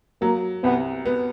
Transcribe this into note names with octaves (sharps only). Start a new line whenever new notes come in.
F#3 A#3
C2 B3
B3